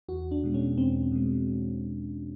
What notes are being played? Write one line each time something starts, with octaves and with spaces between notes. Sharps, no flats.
E2 F#4
D4
B2 G#3
C#4
E2 C4
B2 G#3